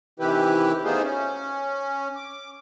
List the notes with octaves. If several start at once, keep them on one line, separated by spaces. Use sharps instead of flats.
C3 D#3 E3 E4 G4 B4
A3 B3 D#4 F4 G#4 C5
C#4
D6